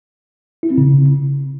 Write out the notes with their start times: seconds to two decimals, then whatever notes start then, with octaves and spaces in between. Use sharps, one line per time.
0.63 E4
0.70 C4
0.78 C#3